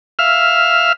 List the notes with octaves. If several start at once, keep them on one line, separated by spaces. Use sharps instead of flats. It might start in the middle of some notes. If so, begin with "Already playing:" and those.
E5 F5 F6